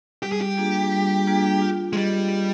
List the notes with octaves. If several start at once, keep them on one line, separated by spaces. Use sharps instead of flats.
G3 G4
G#4
G4
A#3 D4 F4 G#4
G3
A#3 D4 F4 G#4
F4
G#3
G3 G#4 D#5
F4